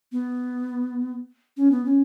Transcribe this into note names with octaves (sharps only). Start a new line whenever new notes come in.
B3
C#4
B3
C#4